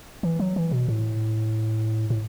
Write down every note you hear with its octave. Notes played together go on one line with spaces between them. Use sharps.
E3
F#3
E3
B2
A2
A2